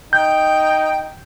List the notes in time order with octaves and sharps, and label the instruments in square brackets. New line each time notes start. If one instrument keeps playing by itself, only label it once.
[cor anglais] D#4 [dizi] G5 [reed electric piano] G6